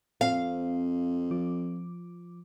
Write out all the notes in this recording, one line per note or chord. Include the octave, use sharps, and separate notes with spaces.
F2 C4 F5
F3 D6